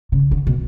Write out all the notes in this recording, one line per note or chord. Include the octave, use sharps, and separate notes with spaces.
C#3
D3
B2